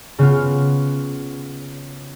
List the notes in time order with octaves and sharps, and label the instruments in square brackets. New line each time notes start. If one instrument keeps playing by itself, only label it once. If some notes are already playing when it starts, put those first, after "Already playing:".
[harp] C#3 B3 F4